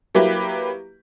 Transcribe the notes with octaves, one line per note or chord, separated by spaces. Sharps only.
F#3 A#3 E4 G4 B4